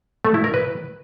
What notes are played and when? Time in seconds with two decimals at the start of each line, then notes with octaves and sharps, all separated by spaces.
0.25 A3
0.34 E4
0.44 A#4
0.54 B4